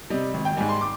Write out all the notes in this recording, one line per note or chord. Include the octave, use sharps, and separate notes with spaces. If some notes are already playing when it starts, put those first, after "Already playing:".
C3 G3 D#5
G#1
G5
G#2 G3 G#5
C6
D6